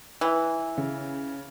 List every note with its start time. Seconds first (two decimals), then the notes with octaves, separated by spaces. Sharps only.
0.21 E3
0.77 C#3